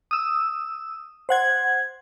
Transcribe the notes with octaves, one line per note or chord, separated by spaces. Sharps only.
D#6 E6
C5 F#5 G#6